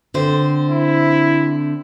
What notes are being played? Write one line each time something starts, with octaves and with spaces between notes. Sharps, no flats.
D3 C4 C5
E4